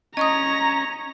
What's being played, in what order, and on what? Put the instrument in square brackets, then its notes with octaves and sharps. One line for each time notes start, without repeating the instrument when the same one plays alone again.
[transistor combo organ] C#4 [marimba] D#5 C#6 D#6 [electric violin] A#5